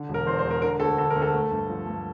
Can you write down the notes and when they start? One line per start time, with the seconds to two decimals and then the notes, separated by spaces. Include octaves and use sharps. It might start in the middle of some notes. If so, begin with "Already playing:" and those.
Already playing: D3
0.09 E1
0.14 A#4
0.26 E2 C5
0.39 C5
0.44 E1
0.51 A#4
0.62 D3 A#4
0.80 D2 A4
0.97 D3 A4
1.10 A#4
1.15 D2
1.22 A4
1.34 A3
1.51 G2
1.69 F3
1.87 G2